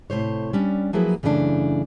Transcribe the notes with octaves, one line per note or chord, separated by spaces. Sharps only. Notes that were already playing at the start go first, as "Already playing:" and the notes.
A2 C3 C5 C#5
G3 C#4 D4
F3 F#3 A#3 E4 G#4 B4
F#2 C#3 E3 A3 B3 D4